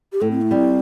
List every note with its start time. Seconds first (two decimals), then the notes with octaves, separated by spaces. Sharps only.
0.13 G4
0.21 A2 A4
0.31 C4
0.41 A3
0.51 G3 C4